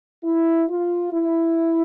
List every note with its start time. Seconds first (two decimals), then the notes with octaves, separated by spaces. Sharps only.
0.24 E4
0.69 F4
1.13 E4